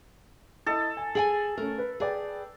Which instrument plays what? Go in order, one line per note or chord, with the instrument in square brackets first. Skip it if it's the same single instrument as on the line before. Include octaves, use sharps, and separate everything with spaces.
[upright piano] E4 D#5 D#6 [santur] A4
[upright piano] G#5
[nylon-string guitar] G#4 G5 G#5 [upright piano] F#7
[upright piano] A3 C#4 [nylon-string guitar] A#4
[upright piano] B4
[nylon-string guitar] G#4 [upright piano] B4 D5 G5